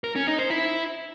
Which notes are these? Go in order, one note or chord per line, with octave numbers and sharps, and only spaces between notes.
A#4
C#4
D#4
C5
E4